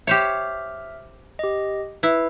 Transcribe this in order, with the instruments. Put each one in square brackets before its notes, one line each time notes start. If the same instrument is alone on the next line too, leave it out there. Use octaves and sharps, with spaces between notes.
[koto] G4 C5 C#5 [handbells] E5 F6
[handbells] G4 D#5
[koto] E4 [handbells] B4